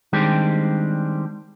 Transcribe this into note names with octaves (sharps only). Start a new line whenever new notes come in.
D#3 G3 G#3 C4 D4 G4